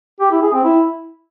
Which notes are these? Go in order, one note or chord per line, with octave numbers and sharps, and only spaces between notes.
G4
E4
G#4
C4
E4